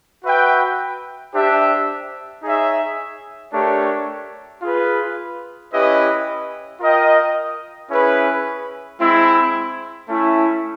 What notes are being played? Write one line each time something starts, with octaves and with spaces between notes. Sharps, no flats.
F#4 B4 E5 G5
D4 G4 C5 E5
D#4 G#4 C#5 E5
A3 D4 G4 A#4 C#5
F4 G#4 B4
C#4 E4 G4 B4 D#5
F4 A#4 D#5 G5
C#4 E4 G#4 B4
G#3 C4 E4
A3 C#4 E4